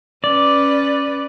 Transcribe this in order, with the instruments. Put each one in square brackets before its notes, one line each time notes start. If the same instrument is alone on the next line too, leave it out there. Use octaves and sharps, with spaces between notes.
[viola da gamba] C#4 B4 [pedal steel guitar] D5